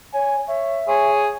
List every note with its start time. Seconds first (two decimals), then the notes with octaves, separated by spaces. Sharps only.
0.14 C#5 G#5
0.48 C#5 E5
0.88 G#4 C#5